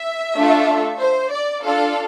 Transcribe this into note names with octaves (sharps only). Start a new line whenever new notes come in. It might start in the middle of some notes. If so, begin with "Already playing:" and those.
Already playing: E5
A3 D4 F4 A4
C5
D5
D4 F4 A4 F5